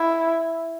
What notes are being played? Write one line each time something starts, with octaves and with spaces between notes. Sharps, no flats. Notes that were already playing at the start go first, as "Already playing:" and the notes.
Already playing: E4